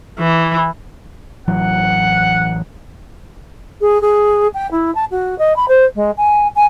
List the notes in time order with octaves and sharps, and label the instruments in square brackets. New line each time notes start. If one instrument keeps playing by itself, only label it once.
[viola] E3
[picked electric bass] A1 E3 F#3 [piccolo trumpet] F#5
[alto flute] G#4
G#4
G5
E4
A5
F#4
D#5
B5
C5
G#3
G#5
G#5